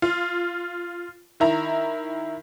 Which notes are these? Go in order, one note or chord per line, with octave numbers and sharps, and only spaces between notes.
F4
D#3 E4 A#5